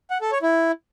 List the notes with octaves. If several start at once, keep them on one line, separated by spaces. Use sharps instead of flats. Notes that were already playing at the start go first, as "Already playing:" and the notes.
F#5
A4
C#5
E4